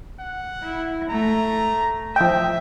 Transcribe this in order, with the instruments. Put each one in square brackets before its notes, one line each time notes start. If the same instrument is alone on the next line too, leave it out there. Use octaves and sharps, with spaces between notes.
[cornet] F#5
[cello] E4
[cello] A3 [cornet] A#5
[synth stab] F3 G5 [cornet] D#5 [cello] E5